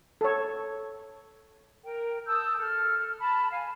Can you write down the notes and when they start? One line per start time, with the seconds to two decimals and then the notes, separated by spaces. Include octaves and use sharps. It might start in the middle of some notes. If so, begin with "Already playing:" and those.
0.21 A4 C#5
1.84 A#4 G5
2.27 A5 D#6 E6 G6
2.59 A4 F6
3.21 A5 B5
3.51 F5 G#5